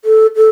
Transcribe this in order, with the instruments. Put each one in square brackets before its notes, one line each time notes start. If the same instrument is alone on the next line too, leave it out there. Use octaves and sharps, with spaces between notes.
[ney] A4
A4